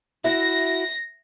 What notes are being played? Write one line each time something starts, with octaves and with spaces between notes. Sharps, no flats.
E4 F#4 E5 A#6